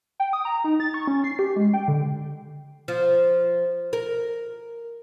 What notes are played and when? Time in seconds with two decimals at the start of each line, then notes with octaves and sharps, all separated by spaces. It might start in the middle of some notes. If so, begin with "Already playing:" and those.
0.20 G5
0.33 D#6
0.45 A#5
0.64 D#4
0.80 A6
0.94 C#6
1.08 C#4
1.24 C7
1.39 G4
1.56 G#3
1.73 G5
1.88 D3
2.88 F3
3.93 A#4